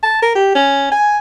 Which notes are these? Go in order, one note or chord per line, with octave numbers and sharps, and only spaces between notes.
A5
A#4
G4
C#4
G#5